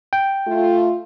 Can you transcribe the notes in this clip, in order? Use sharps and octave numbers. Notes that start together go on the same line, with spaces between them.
G5
A3 F4